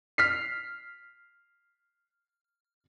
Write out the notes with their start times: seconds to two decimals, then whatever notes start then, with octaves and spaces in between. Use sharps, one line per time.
0.18 F6 B6 C7